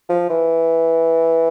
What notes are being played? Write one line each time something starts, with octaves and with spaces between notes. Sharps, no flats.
F3
E3